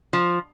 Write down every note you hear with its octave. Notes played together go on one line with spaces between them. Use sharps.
F3